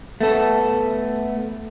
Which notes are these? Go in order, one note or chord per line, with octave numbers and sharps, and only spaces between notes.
A3 B3 A4